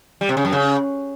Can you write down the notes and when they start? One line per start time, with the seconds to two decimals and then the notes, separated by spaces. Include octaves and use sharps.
0.21 G3
0.29 C3
0.37 C#3
0.45 F#2
0.53 C#3